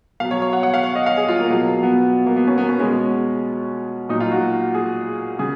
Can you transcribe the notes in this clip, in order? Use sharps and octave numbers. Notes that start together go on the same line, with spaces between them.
B2 F#3 F5
C#5
C#5
F#5
F#5
F5
C#5
D#5
F5
G#4
F4
A#3
B2 F#3
B3
A#3
B3
C#4
B3
C#4
B2 G#3 C#4
A#2 F#3 D#4
F4
F#4
G#4
C#3 G#4